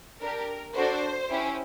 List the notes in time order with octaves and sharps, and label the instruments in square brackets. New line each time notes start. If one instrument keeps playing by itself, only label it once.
[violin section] D4 G4 A#4
D4 F#4 A4 C5
C#4 E4 G4